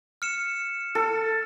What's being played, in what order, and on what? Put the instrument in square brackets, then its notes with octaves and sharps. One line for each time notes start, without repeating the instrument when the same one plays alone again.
[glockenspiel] F6 C#7 E7
[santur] A4